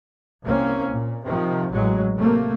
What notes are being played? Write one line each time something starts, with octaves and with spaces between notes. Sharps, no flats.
C2 A#3 C4 C#4
A#2
C3 D#3 F3
A1 A2 F#3 G#3
C3 A3 A#3